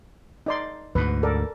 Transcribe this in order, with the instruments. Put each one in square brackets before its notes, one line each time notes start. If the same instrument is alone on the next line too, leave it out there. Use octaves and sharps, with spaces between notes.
[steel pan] D#4 D5 C6
[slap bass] D2 G#2 [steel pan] B4
[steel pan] A4 A#4 D5